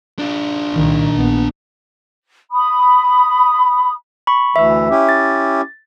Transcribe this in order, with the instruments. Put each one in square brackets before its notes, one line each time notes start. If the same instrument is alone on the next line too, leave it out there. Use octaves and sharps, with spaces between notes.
[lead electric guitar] D4 F4
[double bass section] C2 A#2 D#3
A#1 B3
[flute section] B5 D#6
[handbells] B5 C#6
[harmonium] D2 E3 [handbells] E5 E6
[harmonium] C#4 E4 G4
[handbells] A6